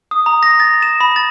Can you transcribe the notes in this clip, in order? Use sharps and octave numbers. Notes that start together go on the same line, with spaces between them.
D#6
A#5
A#6
A6
E7
B5
A6